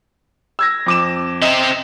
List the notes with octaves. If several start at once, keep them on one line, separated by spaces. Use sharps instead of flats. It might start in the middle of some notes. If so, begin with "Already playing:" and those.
E6 G#6 A#6
F2 D6 E7
C4 D#5 E5